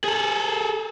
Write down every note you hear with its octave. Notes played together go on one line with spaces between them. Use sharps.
G#4 A4